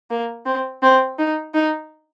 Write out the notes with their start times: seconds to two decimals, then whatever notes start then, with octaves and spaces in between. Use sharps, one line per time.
0.11 A#3
0.46 C4
0.83 C4
1.19 D#4
1.54 D#4